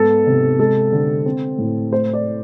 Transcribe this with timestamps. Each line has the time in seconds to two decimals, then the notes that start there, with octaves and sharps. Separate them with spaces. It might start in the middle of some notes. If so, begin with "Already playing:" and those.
Already playing: G#2 B3 A4
0.27 C3
0.59 G#3 A4
0.92 D3
1.26 C4
1.58 A2
1.92 A3 C5
2.13 D5